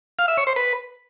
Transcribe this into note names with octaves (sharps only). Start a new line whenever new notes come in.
F5
E5
C#5
C5
B4